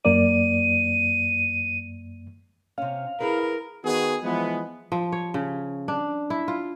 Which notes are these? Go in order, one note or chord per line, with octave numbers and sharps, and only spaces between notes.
F#2 A#3 D5 D#7
C3 C#4 F5
E4 G#4 A#4 B4
D#3 B3 F#4 G#4
E3 F3 G#3 B3
F3
C#5
C#3
D4
E4
F4